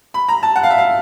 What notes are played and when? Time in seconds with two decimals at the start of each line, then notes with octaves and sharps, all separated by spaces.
0.14 B5
0.28 A#5
0.43 A5
0.56 F#5
0.63 F5
0.70 E5
0.78 F5